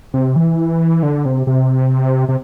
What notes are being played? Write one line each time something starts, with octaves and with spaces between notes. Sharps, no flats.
C3
E3
D3
C3
C3
C3